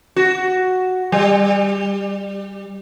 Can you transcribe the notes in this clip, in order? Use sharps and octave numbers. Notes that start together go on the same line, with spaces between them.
F#4
G3